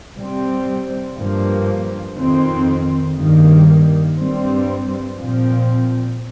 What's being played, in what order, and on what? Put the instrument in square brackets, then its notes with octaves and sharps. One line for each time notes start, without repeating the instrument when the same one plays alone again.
[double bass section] C3 G3 C4
G2 F3 A#3
F2 D#3 C4
G2 D#3 G3 A#3
G2 G3 C4
A#2 F3 C4